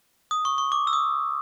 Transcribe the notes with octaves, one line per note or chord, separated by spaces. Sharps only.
D#6
C#6
C#6
D6
E6
D#6